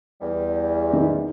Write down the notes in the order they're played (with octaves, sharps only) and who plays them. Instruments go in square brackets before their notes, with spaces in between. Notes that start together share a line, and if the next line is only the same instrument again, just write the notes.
[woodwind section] E2 G3
[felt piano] D#3